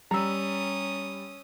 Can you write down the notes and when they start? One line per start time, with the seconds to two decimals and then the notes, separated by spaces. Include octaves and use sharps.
0.11 G3 C#4 A#5 D#6 E6